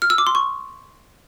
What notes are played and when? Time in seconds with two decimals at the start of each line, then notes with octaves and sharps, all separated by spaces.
0.02 F6
0.10 E6
0.18 D6
0.27 C6
0.35 C#6